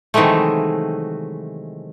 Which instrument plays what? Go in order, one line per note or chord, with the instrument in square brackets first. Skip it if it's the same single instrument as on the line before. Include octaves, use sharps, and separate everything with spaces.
[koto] C3 D#3 E3 F#3 G#3 A3